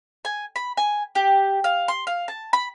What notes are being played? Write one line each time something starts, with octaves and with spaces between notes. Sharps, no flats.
G#5
B5
G#5
G4
F5
C6
F5
A5
B5